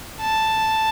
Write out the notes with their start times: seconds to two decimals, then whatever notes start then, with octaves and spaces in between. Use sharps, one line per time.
0.21 A5